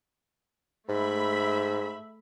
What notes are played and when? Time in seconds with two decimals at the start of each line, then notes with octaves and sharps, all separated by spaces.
0.89 G#2 A3 E5 B5